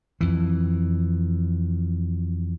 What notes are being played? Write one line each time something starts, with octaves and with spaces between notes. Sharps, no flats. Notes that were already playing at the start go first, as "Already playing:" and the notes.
F2 E3